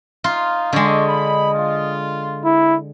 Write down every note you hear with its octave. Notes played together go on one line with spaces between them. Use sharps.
D#4 F4 F5
D3 G#3 D#5 C#6 D6
B5
F4
E4